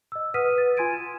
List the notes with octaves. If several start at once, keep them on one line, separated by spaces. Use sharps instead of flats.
D#5 E6
B4 F#5 D#6 F6 B6 D#7
B4 A6
F4 G#5 C6 G#6 D7 D#7
E7